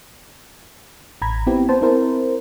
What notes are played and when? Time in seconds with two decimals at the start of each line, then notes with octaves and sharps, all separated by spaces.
1.22 A1 A#5 B5 G#6
1.46 B3 C4 E4 G4
1.69 B3 C5 A5
1.82 C4 E4 A#4 C5